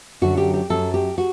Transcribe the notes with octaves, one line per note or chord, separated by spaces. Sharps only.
F#2 D3 F#3 F#4
G4
G4
F#2 F#3 A4
G4
F#4